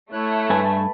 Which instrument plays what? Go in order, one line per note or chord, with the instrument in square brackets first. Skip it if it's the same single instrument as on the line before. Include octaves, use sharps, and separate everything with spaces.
[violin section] A3 [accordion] E4 C#5 F#6
[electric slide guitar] G2 G#5 [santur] B4 A5 B5